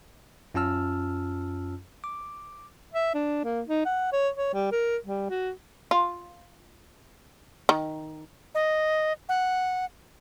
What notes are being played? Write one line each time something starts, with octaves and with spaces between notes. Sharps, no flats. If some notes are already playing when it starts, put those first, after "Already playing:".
F#2 C#4 F4 A5 E6 F6
D6
E5
D4
A#3
D#4
F#5
C#5
C#5
G3
A#4
G3
F#4
F4
D#3
D#5
F#5